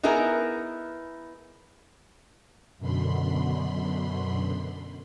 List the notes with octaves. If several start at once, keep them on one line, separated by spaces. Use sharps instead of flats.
B3 D#4 E4 G#4 A#4
F#2 B2 D3 B5 C6